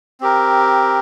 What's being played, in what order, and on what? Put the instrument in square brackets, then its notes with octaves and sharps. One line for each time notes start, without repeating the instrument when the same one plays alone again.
[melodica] C4 G4 A#4